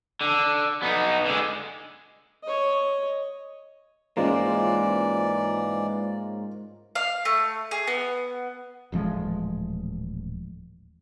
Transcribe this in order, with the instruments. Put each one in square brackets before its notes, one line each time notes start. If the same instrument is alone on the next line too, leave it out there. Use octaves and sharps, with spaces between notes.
[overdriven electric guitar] D3
B3 D#4
D3 G#3
[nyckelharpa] C#5 D#5
[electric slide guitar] G#2 G#3 A#3 [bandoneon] E3 D5 [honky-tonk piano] C#4 F4 C5
[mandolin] F5
A3
G#4
B3
[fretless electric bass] D#1 A1 F3 G#3